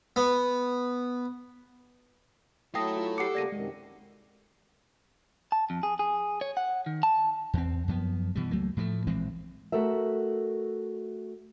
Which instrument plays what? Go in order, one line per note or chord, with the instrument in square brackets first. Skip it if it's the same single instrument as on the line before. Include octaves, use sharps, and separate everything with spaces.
[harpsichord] B3
[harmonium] F#3 E4 [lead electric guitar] A3 A4 [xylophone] G5 D#6 A#6
[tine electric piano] F4
[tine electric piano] G4 F#5 D6 [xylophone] C7 C#7
[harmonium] C#3 G3 A#3 [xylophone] D5 A#6 D#7
[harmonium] F#2 C3 D#3 [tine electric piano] G#3
[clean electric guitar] A5
F2
G#4
G#4
C#5
F#5
D#3
A5
[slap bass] E2 C4
F#2 F3 B3
B2 E3 G3
C#2 F#3 A3 A#3
A2 F3 F#3 A3
A#1 E3 G#3 C4
[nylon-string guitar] A3 F#4 A4 A#4 E5